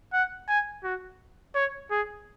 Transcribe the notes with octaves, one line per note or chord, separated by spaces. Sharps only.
F#5
G#5
F#4
C#5
G#4